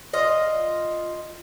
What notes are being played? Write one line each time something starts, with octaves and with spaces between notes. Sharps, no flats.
F4 D#5